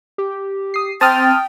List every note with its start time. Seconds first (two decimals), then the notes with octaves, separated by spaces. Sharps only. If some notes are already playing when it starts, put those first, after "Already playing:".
0.18 G4
0.74 D#6 C7
1.01 C4 G5 A5 D#6 F6 A6